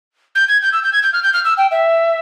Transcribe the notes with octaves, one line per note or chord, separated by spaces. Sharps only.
G6
G#6
G6
E6
G6
G#6
G6
F6
G6
F6
E6
G5
E5